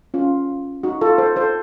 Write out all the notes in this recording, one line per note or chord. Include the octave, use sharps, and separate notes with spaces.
C#4 F4
D#4 F#4
F4 A4
A4 C5
A4 C5